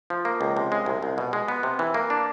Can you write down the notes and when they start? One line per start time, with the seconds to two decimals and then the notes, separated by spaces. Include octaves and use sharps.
0.10 F3
0.25 A#3
0.41 C#2
0.57 C3
0.72 G#3
0.86 C2
1.02 C2
1.18 B2
1.33 G#3
1.48 B3
1.63 C3
1.79 E3
1.94 A#3
2.10 D4